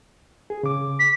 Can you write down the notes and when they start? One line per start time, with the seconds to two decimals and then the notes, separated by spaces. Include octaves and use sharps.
0.50 G#4
0.63 C#3 D6
0.99 B6